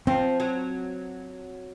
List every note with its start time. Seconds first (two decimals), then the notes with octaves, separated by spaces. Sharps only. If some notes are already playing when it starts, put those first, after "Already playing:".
0.07 F3 C4
0.40 F#3